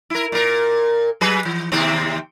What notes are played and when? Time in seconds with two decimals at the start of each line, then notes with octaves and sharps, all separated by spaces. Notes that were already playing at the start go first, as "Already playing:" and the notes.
0.10 E4 A#4
0.32 A#2 A#4
1.21 F#3 G#4 B4
1.45 E3
1.72 D#2 C3 C4